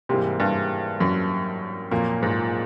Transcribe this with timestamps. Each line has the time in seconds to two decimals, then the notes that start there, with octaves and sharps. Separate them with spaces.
0.09 G#2 C3 E3 G3 A#3
0.40 G2
1.00 F#2
1.91 F2 A#2 F#3 A#3
2.23 G#2